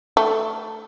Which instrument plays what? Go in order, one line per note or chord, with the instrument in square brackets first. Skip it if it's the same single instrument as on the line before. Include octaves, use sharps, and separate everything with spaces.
[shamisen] A3